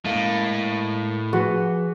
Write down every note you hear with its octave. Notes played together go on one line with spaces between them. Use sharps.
A2 G#3 A#3 F5
F3 F#4 G#4 B4